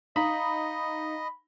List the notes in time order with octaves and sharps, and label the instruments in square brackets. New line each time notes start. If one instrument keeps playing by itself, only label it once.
[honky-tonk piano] D#4 [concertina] D#5 [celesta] F5 A#5 D#6 [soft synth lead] B5